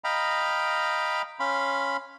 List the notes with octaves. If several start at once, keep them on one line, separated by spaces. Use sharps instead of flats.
D#5 F5 G5 A#5 B5
C#4 F5 B5 C6